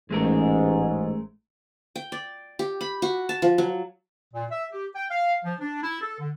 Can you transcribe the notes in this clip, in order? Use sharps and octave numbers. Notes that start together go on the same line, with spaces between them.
A1 G#2 G#3 A3 A#4
G5
D5
G4
B5
F#4
A5
F3
F#3
A#2
E5
G4
G5
F5
F3
D4
E4
A4
D3